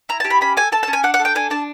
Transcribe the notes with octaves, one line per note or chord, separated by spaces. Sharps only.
E4 A#5
A5
G4
B5
C#4 B5
A4 G#5
A4 A5
A5
C#4
G#5
D4 F#5
F#5
A4
G5
D4 G#5
D4 A5